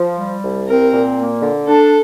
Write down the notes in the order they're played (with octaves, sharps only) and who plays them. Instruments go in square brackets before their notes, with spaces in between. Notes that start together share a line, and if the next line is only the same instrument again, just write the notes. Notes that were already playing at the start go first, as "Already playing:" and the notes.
Already playing: [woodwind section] F3
G3
C2
[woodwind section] C4 [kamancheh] A#4
[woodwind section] A#2
A#3
D3
[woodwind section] D4 [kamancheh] A4